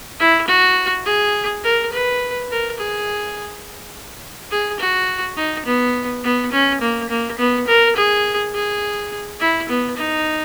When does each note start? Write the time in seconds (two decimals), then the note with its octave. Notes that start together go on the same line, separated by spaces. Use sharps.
0.20 E4
0.48 F#4
1.05 G#4
1.64 A#4
1.93 B4
2.50 A#4
2.79 G#4
4.51 G#4
4.80 F#4
5.37 D#4
5.66 B3
6.24 B3
6.52 C#4
6.82 A#3
7.10 A#3
7.38 B3
7.67 A#4
7.96 G#4
8.54 G#4
9.41 E4
9.69 B3
9.97 D#4